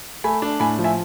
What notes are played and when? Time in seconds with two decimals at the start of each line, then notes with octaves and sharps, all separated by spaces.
0.24 A3 G#5 B5
0.42 D4
0.60 A2 G#5 B5
0.79 F3
0.84 E5 G#5